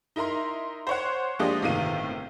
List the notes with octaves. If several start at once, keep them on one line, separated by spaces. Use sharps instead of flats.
D#4 E4 A#4 A#5 C6
C5 C#5 F#5
F3 G#3 A#3 D4 G4 D#5
G1 A2 C3 D#3 F4 D#7